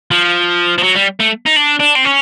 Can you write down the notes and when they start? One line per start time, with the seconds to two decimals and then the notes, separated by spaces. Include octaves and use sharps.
0.11 F3
0.78 F3
0.83 F#3
0.96 G3
1.20 A3
1.46 D#4
1.56 D4
1.80 D4
1.96 C4
2.05 C#4